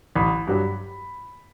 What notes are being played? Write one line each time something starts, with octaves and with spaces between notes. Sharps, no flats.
A1 B5
G2 F#3